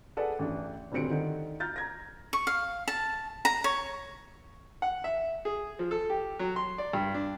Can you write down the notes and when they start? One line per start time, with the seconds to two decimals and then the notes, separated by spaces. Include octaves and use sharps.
0.17 G#4 A4 B4 D5 F#5 G#5
0.39 A1 D4
0.92 D#1 D2 G2 C4 C#7 D7
1.10 D3 D#3
1.60 A#5 F6 G6 A6
1.76 A#5 G#6 A#6
2.33 C#6
2.47 F5
2.88 A5
3.45 A#5
3.64 C#5
4.82 F#5
5.04 E5
5.45 G#4
5.79 F3
5.91 A4
6.10 G4
6.39 F#3
6.56 C6
6.78 D5
6.93 G2
7.14 D4